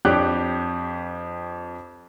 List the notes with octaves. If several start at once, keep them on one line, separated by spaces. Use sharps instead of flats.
F2 D4 G4 C#5 D6 F#6